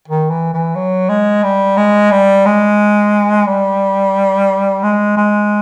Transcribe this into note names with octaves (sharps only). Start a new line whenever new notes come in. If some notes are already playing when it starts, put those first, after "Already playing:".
D#3
E3
E3
F#3
G#3
G3
G#3
G3
G#3
G3
G#3
G#3